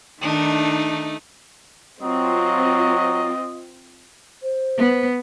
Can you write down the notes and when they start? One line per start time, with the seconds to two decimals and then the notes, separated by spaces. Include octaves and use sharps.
0.21 D#3 A3 D4 D#4
2.02 F#3 C4 F4 D#5
4.43 C5
4.77 B3